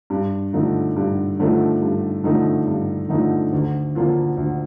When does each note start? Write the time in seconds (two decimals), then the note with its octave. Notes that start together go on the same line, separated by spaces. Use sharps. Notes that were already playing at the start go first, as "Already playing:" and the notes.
0.10 G2
0.53 D3 F3 A3 D#4
0.96 G2
1.39 D3 F3 A3 D#4
1.82 G2
2.24 D3 F3 A3 D#4
2.67 G2
3.09 D3 F3 A3 D#4
3.53 D2
3.95 D3 F3 A#3 F4
4.37 D2